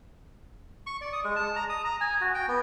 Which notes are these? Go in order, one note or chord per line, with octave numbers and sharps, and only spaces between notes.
C#6
D5
D#6
G#3
A5
A#5
D#6
A#5
G#5
F#4
G5
B3